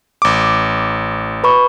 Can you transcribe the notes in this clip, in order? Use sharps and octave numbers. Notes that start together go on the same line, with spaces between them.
A1 D6
B4 B5 C#6